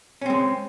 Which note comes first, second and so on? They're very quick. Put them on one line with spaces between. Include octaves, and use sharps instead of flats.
C#4 C4 G#3